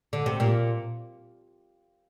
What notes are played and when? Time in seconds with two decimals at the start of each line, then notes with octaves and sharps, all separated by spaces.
0.13 D3
0.26 C3
0.40 A#2